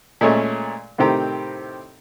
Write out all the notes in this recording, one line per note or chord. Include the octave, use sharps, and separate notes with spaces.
A#2 G#3 A3 C#4
A2 C3 D#3 C4 G4 A#5